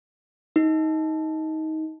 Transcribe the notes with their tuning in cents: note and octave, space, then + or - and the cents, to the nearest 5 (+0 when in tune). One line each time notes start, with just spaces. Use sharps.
D#4 +20